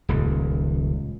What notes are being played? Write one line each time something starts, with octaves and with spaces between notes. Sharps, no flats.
D#1 C#2